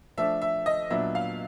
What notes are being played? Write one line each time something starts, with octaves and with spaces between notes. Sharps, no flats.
F3 A3 D4 E5
E5
D#5
A#2 F#3 B3 D4 E5
F5